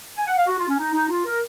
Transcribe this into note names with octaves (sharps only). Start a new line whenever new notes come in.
G#5
F#5
F5
F#4
F4
C#4
D#4
D#4
F4
A#4